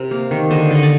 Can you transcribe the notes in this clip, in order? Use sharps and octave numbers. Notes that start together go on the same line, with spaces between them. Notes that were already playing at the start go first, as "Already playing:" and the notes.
Already playing: C3 A#4
A#3
D#3
D3 C5 D#5
D3 D#5
D5